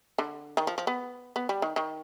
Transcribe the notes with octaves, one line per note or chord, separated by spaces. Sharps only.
D3
D#3
F3
F3
B3
B3
G3
D#3
D#3